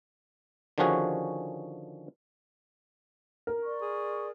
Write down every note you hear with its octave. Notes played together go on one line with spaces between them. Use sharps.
D3 D#3 F3 C#4 F#4 G#4
A#4
D5 C6 C#6
G#4